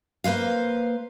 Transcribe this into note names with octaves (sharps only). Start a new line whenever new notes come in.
A#3 B4 C5 F5